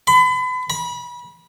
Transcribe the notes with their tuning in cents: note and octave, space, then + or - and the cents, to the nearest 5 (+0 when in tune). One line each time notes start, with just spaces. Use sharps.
B5 +35
B5 -30